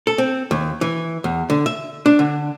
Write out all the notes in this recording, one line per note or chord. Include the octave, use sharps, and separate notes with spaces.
A4
C4
D#2
E3
E2
D3
E5
D4
D3